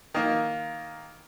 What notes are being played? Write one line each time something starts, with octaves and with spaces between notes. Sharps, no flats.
D#3 A#3